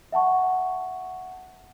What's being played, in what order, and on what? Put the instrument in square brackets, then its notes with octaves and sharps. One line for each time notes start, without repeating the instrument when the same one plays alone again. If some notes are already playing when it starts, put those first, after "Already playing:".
[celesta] E5 F#5 A5 C#6